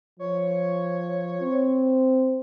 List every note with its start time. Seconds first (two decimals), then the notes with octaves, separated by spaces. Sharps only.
0.19 F3 C#5
1.41 C4